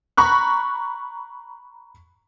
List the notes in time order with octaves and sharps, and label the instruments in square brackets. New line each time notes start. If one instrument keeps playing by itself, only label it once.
[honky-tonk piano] A#5 B5 C#6 F#6